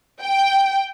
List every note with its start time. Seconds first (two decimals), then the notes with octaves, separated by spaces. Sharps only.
0.20 G5